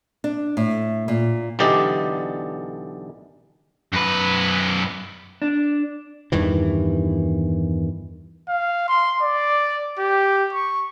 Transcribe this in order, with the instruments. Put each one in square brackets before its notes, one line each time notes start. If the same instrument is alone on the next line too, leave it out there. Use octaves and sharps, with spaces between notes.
[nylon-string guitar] D4
A2
A#2
[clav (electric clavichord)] B1 D3 E3 G4 D5 D#5
[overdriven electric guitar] F#2 B4
[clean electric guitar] D4
[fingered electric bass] E2 G2 D#3 E3
[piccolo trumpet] F5
C6
D5
G4
C#6